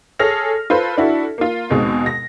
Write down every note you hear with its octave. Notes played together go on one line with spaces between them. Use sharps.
G#4 A4 C#5 F6 A#6 F7
F4 A4 B4 C5
D4 E4 F#4 A4
A#3 F4
D#2 B2 G#3 C4
A#6